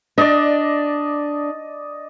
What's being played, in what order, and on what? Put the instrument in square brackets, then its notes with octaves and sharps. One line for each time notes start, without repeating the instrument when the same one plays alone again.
[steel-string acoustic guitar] D4 [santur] D5 D#5